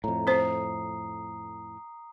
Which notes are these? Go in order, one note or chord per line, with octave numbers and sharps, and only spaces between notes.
F2 A2 A#5
C4 C5 D#6 C7